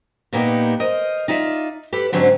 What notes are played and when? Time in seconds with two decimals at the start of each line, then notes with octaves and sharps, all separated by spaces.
0.33 A#2 A#3 B3 D#4 G4
0.80 A#4 C5 D#5
1.28 D#4 F4 D5 E5
1.93 G4 A4 B4
2.12 G#2 D3 F#3 C4 C#4 A#5